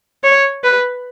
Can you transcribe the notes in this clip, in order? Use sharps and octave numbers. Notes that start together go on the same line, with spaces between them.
C#5
B4